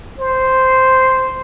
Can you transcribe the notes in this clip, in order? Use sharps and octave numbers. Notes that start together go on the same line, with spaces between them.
C5